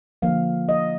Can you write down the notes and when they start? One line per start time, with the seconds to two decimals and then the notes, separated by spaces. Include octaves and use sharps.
0.22 D3 F3 A#3 F5
0.69 D#5